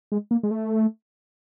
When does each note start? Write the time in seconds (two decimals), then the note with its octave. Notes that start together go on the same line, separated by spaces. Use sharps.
0.12 G#3
0.31 A#3
0.43 G#3
0.51 A3